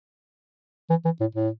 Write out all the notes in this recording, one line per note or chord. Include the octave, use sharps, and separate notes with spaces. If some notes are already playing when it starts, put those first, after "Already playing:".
E3
E3
A2
A2